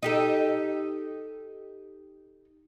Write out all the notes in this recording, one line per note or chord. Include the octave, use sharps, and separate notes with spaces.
D#4 G4 A4